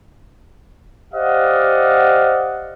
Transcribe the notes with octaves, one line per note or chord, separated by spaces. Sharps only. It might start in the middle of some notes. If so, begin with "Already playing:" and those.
G4 C5 D5 D#5 F5 F#5